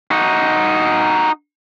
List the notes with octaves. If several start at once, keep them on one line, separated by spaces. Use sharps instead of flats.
D#4 F#4